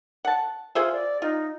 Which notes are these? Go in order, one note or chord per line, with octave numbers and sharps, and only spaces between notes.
F#5 A5
F4 G#4 C5 E5
D5
D#4 F4